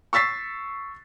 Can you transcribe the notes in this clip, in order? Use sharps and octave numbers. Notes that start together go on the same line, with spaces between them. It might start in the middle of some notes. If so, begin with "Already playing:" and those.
C#6 E6 A6 B6 C7